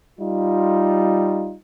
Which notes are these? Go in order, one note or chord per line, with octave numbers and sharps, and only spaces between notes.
G3 D#4 F4